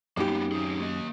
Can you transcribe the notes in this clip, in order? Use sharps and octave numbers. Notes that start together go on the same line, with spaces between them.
F#2 A#3 B3 D#4 G4
C4 G#4
A#3 D#5